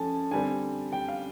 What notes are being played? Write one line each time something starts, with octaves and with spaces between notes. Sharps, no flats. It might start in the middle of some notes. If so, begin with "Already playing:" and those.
Already playing: F3 A3 C#4 G#5 A5
D3 G3 C4 G#5
G5
F5